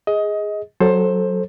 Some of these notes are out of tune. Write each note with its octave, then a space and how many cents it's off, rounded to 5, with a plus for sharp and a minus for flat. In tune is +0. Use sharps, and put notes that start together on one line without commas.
G#4 -5 D#5 +20
F#3 +0 A4 +0 C5 +20